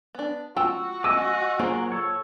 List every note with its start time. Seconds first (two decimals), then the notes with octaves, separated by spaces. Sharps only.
0.15 B3 D4
0.57 F4 F#4 F#5 G5 E6
1.04 D#5 G#5 D6 E6
1.59 F#3 A#3 F4 G#4 C5
1.92 A4 C#5